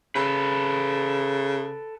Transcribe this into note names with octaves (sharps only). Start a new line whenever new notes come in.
C#3 A4 B4